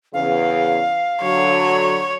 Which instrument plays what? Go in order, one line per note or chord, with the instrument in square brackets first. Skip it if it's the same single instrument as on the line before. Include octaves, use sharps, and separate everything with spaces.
[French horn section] E2 C#3 [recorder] F5
[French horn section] D3 F#3 [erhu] C#5